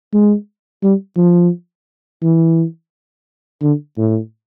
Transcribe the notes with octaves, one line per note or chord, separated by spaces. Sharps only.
G#3
G3
F3
E3
D3
A2